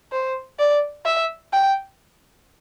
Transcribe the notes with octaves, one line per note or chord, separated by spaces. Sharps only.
C5
D5
E5
G5